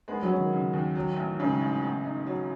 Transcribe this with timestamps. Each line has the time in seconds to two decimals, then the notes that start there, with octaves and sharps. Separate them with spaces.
0.08 G#3 B3
0.23 F#3
0.30 C#4
0.37 D#3
0.53 C#3
0.73 D#2
0.95 F#3
1.17 A1
1.40 G#2 C#3
1.61 A1
1.83 B3
2.04 D#4
2.27 F#3